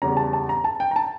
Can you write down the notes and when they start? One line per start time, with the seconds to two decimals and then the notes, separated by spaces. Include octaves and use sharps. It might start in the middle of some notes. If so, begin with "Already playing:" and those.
0.02 E2 C#3 G3 C#4 A#5
0.17 A5
0.33 A5
0.49 A#5
0.64 A5
0.80 G5
0.91 A#5
0.96 A5